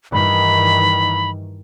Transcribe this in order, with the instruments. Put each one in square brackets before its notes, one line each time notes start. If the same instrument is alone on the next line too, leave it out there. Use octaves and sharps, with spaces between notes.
[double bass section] G2 D#3 E3 [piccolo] B5